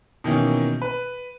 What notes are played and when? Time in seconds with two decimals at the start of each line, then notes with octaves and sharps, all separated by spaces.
0.24 B2 D#3 E3 A#3 C#4
0.82 B4